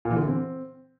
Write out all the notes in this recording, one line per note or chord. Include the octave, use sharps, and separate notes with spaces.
A#2
E3
D3
E3
C4